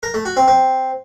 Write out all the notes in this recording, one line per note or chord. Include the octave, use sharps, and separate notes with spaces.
A#4
A3
F#4
C4
C4